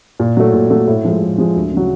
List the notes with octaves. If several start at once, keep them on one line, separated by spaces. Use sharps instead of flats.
A#2
F#3 A3
A#2
F#3 A3
A2
F3 G#3
A2
F3 G#3
D2
C#3 F#3